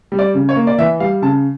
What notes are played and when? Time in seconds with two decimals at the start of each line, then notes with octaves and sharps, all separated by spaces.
0.12 G3
0.19 D5
0.34 C#3
0.49 C#5
0.56 A#3
0.67 D5
0.78 E3 E5
1.00 G3 F5
1.22 C#3 A5